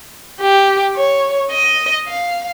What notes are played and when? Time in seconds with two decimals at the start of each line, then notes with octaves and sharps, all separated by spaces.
0.41 G4
0.95 C#5
1.51 D#5
2.07 F5